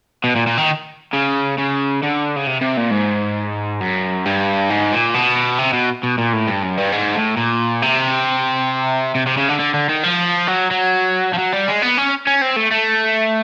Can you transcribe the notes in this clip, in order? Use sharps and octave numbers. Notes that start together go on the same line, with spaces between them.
B2
A#2
A#2
D#3
C#3
C#3
D3
C#3
C3
C3
A#2
G#2
F#2
G2
G#2
A#2
B2
C3
B2
B2
A#2
A2
G2
F#2
G2
G#2
A2
A#2
C3
C3
C3
C#3
D3
D3
D3
D#3
F3
F#3
F#3
F3
F#3
G3
G#3
B3
C#4
C#4
C4
A3
A3